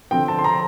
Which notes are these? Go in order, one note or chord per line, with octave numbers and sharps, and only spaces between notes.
D3 F3 C4 G5
A5
C6
A#5